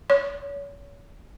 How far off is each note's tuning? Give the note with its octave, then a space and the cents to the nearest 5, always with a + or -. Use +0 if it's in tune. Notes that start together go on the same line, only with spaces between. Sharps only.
C#5 +35